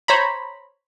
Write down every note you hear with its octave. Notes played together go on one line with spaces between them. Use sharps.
C5 C#5 A#5 B5